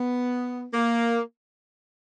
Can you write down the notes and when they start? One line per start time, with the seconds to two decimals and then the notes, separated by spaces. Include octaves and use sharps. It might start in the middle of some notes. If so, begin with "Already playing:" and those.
Already playing: B3
0.74 A#3